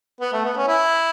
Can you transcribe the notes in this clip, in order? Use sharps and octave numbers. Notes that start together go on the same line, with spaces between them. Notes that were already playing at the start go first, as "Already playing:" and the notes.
B3
A3
B3
C#4
E4